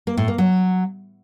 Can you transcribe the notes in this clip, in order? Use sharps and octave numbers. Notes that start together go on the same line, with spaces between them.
A#3
A2
A#3
F#3